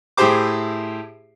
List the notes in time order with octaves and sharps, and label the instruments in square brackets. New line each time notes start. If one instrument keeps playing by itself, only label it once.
[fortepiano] A2 E4 G4 G#4 C5 D6